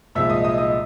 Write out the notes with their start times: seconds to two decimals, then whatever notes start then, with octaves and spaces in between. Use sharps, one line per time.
0.15 C2 A#2 F3 G#3 E5 E6
0.30 D#5 D#6
0.44 D#5 D#6
0.58 D#5 D#6